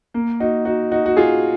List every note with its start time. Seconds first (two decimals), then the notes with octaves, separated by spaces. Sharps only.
0.14 A#3
0.40 D#4 F#4
0.65 D#4 F#4
0.92 D#4 F#4
1.06 F#4
1.17 F4 G#4